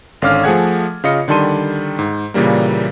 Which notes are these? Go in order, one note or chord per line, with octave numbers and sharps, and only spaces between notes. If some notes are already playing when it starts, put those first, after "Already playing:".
G#1 D3 C#4 F5 D6 F6
F3 A3 G#4 F#5 G#6
C#3 F4 D#5 C#7
D3 D#3 G3 A4 C6 D#7
G#2
A#2 C#3 E3 G3 A#3